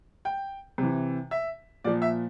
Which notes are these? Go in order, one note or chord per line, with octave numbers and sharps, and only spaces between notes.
G5
C3 E3
E5
A#2 F3 D5
E5